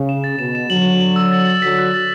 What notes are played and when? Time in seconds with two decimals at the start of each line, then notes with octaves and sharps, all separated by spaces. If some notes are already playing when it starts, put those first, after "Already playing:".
Already playing: C#3
0.09 E7
0.24 A6
0.39 B2 E7
0.55 E7
0.69 D3 F#3 F#7
0.86 F#7
1.00 F#7
1.16 E6
1.32 A6
1.47 A6
1.62 D3 F#3 B6
1.78 F#6
1.94 A6